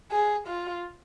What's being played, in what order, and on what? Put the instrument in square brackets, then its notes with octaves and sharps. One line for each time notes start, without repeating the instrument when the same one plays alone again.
[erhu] G#4
F4